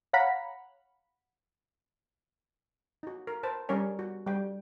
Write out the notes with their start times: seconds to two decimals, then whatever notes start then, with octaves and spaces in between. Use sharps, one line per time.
0.13 C#5 F5 F#5 A#5 B5
3.03 D#4 F#4
3.27 A#4
3.43 B4 C5 A5
3.69 G3 C#4 A#4 C#5 G#5
3.99 F#4
4.27 G3 G5